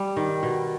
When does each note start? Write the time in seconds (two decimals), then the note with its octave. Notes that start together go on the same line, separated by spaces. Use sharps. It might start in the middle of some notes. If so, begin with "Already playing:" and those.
Already playing: G3
0.17 D#3
0.43 B2